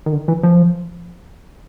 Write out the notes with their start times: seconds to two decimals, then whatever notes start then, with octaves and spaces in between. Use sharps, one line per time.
0.06 D#3
0.12 D3
0.28 E3
0.43 F3